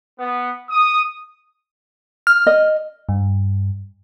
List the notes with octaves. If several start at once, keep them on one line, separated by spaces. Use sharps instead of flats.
B3
D#6
F6
D#5
G2